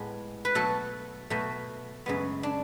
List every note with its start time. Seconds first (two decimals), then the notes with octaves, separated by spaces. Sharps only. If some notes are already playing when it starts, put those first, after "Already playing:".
Already playing: A2 G#3 B3
0.45 B4
0.55 B2 F#3 A3 A4
1.30 B2 F#3 A3
2.06 F#2 C#3 G#3 B3
2.43 D4